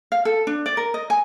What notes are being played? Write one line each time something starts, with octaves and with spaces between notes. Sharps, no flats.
F5
A4
D4
D5
A#4
D#5
G#5